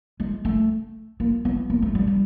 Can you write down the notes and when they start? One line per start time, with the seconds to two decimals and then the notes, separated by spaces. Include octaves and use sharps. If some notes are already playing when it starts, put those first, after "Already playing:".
0.20 G#3
0.45 A3
1.20 A#3
1.45 B3
1.70 A#3
1.82 A3
1.95 G3
2.08 G3